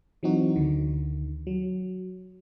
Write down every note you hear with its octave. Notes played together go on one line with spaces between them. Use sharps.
E3 F#3 C4 D#4 F#4
D2 D3 D#3
F#3